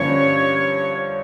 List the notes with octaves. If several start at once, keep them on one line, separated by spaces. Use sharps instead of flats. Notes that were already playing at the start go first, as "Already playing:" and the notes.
Already playing: G2 D3 F3 A#3 C#4 C#5